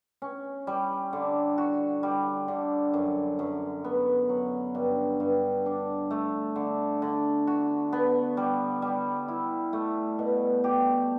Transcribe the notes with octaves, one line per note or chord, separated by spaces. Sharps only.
C#4
G3
D3
F#4
G3
D3
F#2
F#2
B3
F#3
G2
G2
D4
A3
D3
D3
F#4
B3
G3
G3
E4
A3
B2
G4